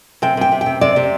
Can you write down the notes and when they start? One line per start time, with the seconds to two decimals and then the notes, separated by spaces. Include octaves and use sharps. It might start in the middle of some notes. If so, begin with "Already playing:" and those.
0.22 C3 G5
0.37 C3 G5
0.52 C3
0.61 G5
0.66 C3
0.81 C3 D5
0.96 C3